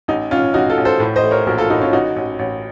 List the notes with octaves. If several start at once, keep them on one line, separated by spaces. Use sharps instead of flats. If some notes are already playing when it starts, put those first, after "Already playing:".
A1 D#4
A1 C#4 F4
A1 D#4 F#4
F4 A4
A1
A4 C5
A2
C5 D#5
A3
A#4 C#5
A#1 F#4 A#4
F4 A4
A2 D#4 F#4
C#4 F4
A1 D#4 F#4
A1
A1